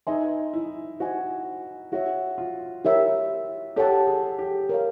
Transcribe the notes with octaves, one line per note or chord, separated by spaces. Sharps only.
D#4 G#4 B4 E5 G#5 C6
E4
F#4 C5 D#5 G#5
F#4 G#4 C#5 E5
F4
E4 G4 A#4 C#5 E5
G4 A4 C#5 F#5 A5
G#4
G4
A#4 C#5 F5